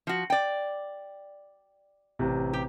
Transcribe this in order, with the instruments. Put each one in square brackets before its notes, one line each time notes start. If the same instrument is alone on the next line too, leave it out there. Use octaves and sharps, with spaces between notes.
[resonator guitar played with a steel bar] F3 F#4
D5 G5
[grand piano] A1 C3
[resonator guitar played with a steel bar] G4